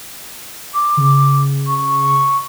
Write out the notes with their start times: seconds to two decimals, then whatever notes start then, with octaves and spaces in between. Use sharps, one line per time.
0.74 D6
0.97 C#3
1.66 C#6